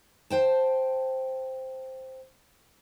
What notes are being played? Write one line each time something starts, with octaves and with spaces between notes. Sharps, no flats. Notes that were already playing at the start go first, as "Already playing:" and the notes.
C5 G5 A5